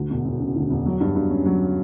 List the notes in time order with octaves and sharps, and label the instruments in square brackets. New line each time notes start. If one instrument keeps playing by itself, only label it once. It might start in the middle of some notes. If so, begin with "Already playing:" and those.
Already playing: [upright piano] D2
E1
E1
C#3
D2
E1
F#3
G2
G2
C#4
F#3